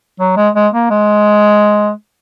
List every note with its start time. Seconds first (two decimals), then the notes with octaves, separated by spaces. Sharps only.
0.20 F#3
0.37 G#3
0.56 G#3
0.74 A#3
0.91 G#3